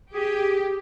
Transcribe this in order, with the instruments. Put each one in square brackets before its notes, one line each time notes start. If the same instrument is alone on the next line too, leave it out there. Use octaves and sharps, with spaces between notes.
[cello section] G4 [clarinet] G#4